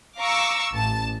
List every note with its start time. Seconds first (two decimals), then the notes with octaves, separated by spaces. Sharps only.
0.19 F5 A#5 C#6 D6 E6
0.74 A1 A5